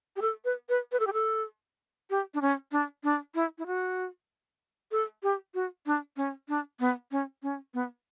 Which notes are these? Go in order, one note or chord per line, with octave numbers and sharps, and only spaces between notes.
G4
A4
B4
B4
B4
A4
G4
A4
G4
D4
C#4
D4
D4
E4
E4
F#4
A4
G4
F#4
D4
C#4
D4
B3
C#4
C#4
B3